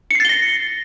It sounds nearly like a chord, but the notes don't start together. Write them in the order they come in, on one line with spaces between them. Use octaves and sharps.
C#7 C7 A6 G7 A#6